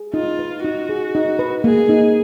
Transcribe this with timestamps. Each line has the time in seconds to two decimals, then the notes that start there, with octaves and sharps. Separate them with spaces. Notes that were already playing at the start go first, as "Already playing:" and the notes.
Already playing: G#4
0.14 D#4 F4
0.39 B4
0.64 D#4 F#4
0.89 G#4
1.15 D#4
1.39 B4
1.64 A#3 G#4
1.89 D#4